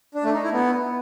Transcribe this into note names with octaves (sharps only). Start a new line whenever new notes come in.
D4
A3
D#4
E4
B3